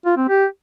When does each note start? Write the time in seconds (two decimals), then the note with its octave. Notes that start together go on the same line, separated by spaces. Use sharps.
0.05 F4
0.17 C4
0.29 G4